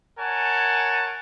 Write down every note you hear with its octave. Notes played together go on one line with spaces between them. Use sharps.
A#4 C#5 F#5 G#5 A5